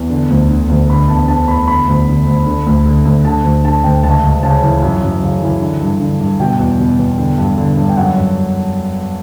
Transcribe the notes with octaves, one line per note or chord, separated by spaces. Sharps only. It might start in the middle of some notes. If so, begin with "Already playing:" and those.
Already playing: E2
D3
D2
D3
D2
D3 B5
E2 A5
D3 A5
E2 B5
D3 B5
D2
D3
D2
D3
D2
D3
D2
D3 A5
D2
D3 A5
D2 G5
C#2 A5
C#2
C#3 A5
E3
F#2
F#2
C#3
E3
D3
G2
D3
G2
B2 G5
E2
B2
E2
D3
G2
D3
G2
G5
F#2 F#5
F#2